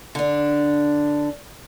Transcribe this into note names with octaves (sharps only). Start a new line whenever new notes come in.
D3 D4